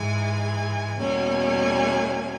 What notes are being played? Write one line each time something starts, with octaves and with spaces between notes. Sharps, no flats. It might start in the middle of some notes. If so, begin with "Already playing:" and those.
Already playing: G#2 E3 G#3 G#5
E2 B2 G3 A#3 C#4 G#5